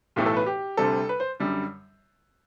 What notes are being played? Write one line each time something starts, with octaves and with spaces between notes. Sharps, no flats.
B1 A2 E3 A3 G4
A4
B4
G4
D2 C3 G3 A4
B4
C5
F#2 D3 G3